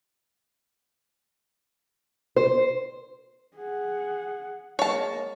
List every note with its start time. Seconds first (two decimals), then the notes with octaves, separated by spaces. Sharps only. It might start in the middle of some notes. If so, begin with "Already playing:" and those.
2.36 C5
3.57 G#4 F#5
4.79 G#3 A#3 C#5 A5